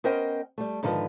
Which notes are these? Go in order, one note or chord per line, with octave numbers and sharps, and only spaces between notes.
B3 C#4 A#4 C5 D#5 G5
G3 A3
G#2 D3 D#3 F3 B4